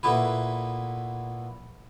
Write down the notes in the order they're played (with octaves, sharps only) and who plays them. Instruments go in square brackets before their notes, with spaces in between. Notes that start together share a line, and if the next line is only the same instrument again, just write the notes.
[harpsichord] A#2 A3 B3 E4 B4